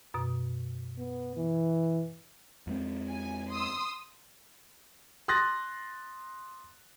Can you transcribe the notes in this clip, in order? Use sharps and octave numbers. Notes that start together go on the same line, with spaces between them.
F#2 B2
B3
E3
F2 G#3 C4
G#5
C6 D#6 E6
C6 D#6 F#6 A6 A#6